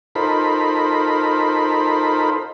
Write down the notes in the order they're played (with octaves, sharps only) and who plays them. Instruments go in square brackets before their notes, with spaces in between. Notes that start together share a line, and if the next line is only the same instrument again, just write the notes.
[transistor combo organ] D#4 F4 A4 A#4 C5 B5